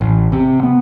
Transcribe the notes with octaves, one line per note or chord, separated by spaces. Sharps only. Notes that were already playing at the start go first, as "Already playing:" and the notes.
A1
C3
B3